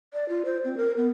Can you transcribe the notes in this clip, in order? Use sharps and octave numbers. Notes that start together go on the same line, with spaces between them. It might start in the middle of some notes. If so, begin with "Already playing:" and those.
D5
F4
C5
C4
A#4
B3